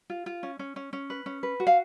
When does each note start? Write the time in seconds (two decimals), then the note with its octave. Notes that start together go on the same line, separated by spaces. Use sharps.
0.10 F4
0.26 F4
0.43 C#4
0.59 C#4
0.76 C#4
0.93 C#4
1.10 B4
1.26 C#4
1.43 B4
1.60 F#4
1.67 F5